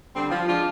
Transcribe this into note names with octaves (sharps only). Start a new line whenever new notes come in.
D3 G3 C4
F3
G#3 D4 F4